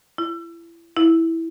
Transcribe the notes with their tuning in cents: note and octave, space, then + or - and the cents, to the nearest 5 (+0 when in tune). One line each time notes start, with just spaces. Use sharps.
E4 +30
E4 -5